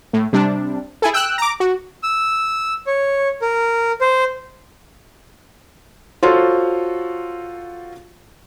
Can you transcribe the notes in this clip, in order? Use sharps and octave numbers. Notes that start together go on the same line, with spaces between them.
A2
C3 G3 D4
E4 G#4 A4
G5 E6 F#6
A#5 D6
F#4
E6
C#5
A#4
C5
F4 F#4 A4 C5 C#5